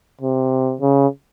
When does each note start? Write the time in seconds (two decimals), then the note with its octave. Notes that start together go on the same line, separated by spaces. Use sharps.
0.21 C3
0.81 C#3